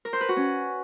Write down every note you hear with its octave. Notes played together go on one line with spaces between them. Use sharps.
A#4
C5
B4
F#4
C#4